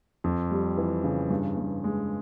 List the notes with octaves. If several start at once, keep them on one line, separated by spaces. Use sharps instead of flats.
F2
G3
E3
C#3
G2
G2
G#3